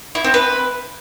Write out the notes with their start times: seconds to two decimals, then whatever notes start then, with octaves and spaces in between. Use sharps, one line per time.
0.15 E4
0.24 C4
0.34 B4